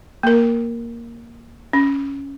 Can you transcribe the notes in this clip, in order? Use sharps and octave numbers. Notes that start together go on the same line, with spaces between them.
A#3 A#4
C#4